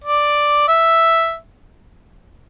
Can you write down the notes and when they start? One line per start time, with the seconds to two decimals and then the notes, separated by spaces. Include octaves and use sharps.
0.04 D5
0.68 E5